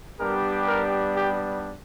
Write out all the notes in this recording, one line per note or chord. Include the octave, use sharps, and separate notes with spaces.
G3 B3 D4 G4 A#4
A#4
G4